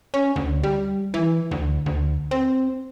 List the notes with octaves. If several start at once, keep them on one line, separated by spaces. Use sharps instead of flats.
C#4
D2
G3
E3
D2
D2
C4